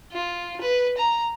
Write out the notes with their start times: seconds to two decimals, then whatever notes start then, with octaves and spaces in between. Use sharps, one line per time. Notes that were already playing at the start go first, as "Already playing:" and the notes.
0.12 F4
0.61 B4
0.97 A#5